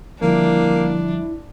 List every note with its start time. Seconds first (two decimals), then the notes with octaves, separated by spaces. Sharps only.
0.22 D3 F3 G3 A#3 D4 E4